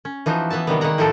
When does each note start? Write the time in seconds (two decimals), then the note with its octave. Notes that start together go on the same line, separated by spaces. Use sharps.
0.05 C#4
0.26 E3 F3 D#4 F#4
0.50 E3 B3 E5 A5
0.67 C3 D#3 G3 B3
0.81 D#3 G#3 A#3 F#5 A#5
0.98 A2 F3 D#4 F#4 A4 D5